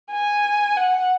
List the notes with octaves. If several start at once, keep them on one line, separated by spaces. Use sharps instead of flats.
G#5
F#5